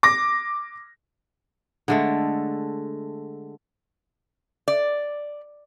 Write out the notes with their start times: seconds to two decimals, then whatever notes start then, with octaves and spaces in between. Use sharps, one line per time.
0.03 D6 A#6
1.88 D3 G#3 A3
4.68 D5